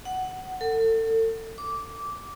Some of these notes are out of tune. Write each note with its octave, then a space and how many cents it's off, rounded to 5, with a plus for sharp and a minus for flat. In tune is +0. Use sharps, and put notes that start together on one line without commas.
F#5 +10
A4 +35
D6 -15